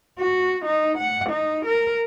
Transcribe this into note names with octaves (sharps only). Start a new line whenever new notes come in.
F#4
D#4
F#5
D#4
A#4